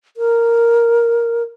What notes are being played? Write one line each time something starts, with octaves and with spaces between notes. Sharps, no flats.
A#4